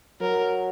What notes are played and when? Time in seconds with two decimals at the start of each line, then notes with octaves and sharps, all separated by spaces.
0.21 F#3 A#4